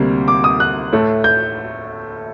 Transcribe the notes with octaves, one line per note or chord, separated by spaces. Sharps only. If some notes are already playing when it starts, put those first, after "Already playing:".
Already playing: D2 C3 G3 A#3
D6
D#6
F#6
A2 A3
G6